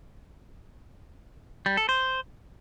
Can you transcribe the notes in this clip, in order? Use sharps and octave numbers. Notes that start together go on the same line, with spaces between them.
G3
A4
C5